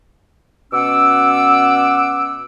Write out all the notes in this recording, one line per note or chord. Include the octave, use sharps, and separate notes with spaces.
B2 C#4 F#5 D6 E6